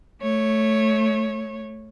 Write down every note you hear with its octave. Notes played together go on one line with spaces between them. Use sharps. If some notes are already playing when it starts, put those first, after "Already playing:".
A3 C#5